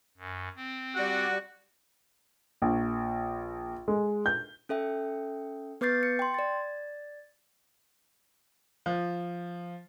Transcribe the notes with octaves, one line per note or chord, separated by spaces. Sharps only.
F#2
C4
G3 F#4 D5 F#5
A#1
G#3
G6
C#4 A4 E5 G5
B3 B4 D6 G6 A6 C7
C#7
G5 C6
D5 A6
F3